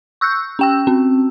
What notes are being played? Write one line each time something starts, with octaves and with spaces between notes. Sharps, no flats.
C#6 E6 F#6 G6
C#4 G5 E6
C4